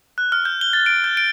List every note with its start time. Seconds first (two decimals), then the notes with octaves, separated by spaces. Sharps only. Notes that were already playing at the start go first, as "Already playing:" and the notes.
0.18 F#6
0.32 F6
0.45 G6
0.61 G7
0.73 A6
0.86 D7
1.04 G6
1.17 D7